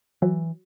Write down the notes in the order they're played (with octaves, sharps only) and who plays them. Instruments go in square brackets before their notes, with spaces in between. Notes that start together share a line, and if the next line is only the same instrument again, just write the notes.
[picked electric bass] E3 [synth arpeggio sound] F#3